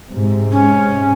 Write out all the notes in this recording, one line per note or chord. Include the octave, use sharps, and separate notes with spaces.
G#2 C3
C#4